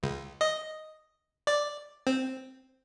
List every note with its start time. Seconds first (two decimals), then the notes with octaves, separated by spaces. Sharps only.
0.03 C#2
0.41 D#5
1.47 D5
2.07 C4